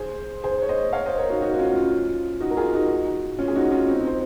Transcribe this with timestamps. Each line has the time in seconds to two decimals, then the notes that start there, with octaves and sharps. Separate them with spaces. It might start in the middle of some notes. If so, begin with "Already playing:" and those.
Already playing: G#4 C5
0.44 G#4 C5
0.62 C#5
0.69 C5 D#5
0.93 C#5 F5
1.06 C5 D#5
1.18 A#4 C#5
1.30 D#4 F#4
1.42 D#4 F#4
1.54 F#4
1.59 C#4 F4
1.75 C#4 F4
2.40 D#4 F#4
2.51 A#4
2.57 F4 G#4
2.73 D#4 F#4
3.39 C#4 F4
3.48 G#4
3.55 D#4 F#4
3.71 C#4 F4
3.88 C4 D#4
4.07 C5